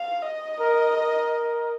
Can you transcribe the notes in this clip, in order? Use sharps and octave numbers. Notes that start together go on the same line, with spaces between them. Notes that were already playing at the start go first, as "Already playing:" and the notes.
Already playing: F5
D#5
A#4
A#4